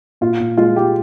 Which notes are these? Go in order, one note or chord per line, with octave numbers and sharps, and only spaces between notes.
A#2 F4
A#2
G#3 F4
G#3 G4